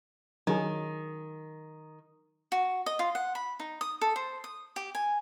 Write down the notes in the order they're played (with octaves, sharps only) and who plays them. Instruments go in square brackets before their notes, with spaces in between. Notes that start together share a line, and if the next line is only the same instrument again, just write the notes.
[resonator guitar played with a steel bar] D#3 [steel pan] F#3 G#4
[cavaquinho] F#4
D#5
F4
F#5
B5
D#4
D#6
A4
C5
D#6
G4
G#5